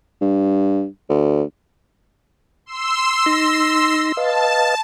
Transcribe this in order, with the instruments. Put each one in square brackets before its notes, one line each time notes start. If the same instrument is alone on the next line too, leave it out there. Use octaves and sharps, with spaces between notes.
[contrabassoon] G2
D2
[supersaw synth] C6 E6
[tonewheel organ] D#4 A#6
[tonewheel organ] B4 D#5 F5 [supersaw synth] A5